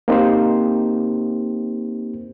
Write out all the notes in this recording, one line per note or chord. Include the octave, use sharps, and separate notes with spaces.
A#3 C4 D#4 G4 C5